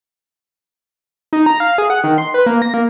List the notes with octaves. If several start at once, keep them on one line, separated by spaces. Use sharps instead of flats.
D#4
A#5
F5
G#4
F#5
D#3
C6
B4
A#3
A#6
A#3